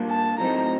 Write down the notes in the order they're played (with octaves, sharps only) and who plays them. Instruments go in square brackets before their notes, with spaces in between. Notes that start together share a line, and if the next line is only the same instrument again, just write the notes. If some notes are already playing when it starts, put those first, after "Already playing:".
Already playing: [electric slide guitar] A#2 G3 A#3 D4
[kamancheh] A5
[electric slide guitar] A2 F#3 A3 C4 D#4 [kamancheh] A#5